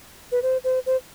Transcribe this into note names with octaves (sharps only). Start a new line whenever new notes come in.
B4
C5
C5
C5